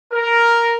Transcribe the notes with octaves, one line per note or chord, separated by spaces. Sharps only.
A#4